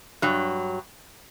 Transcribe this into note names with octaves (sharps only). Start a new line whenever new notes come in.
G2 F#3